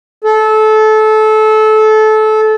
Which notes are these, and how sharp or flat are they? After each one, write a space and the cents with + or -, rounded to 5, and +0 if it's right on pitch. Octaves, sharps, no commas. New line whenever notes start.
A4 -25